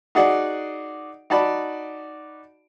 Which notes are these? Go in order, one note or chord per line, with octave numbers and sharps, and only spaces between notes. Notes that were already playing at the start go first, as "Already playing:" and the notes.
D#4 F#4 G#4 D5 F#5
D#4 F#4 D5 A5 B5